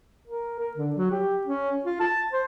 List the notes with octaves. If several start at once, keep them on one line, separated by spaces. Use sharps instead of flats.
A#4
A#4
D3
F#3
G4
C#4
F4
A5
C5